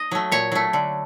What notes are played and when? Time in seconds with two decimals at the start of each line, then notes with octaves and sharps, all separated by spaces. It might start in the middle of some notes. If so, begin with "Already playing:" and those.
Already playing: D#5
0.11 F#3 A3
0.32 A#2 C#5
0.52 F#3 A3
0.73 D3